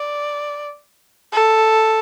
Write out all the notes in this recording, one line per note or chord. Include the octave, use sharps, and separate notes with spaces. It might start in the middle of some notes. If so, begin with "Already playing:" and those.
Already playing: D5
A4